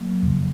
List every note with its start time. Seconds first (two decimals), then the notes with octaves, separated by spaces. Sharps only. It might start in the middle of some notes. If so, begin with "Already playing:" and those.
Already playing: F#3 A#3
0.23 F2 C#3